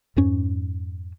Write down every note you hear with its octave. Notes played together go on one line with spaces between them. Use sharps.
F2 G#2 C#4